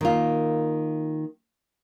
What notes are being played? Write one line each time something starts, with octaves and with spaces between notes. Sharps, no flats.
D#3 A#3 F4